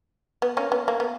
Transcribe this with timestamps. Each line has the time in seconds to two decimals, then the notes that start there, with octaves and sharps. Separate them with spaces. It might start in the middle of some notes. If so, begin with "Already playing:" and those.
0.42 B3
0.57 A#3 C#4
0.72 B3
0.88 A#3
1.00 B3